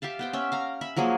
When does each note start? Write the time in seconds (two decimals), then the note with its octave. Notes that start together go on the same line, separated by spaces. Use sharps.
0.02 G4 E5 F5 A5
0.19 B3 C5 G5
0.33 C#4 E5 G5
0.52 F5 A#5
0.81 E5 B5
0.96 F3 F#3 A#3 G#4